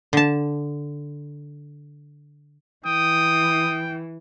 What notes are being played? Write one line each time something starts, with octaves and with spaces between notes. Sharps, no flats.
D3 A5
E3 G5 D#6